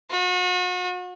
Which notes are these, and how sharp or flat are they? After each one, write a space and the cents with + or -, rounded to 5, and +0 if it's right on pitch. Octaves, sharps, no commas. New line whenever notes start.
F#4 -40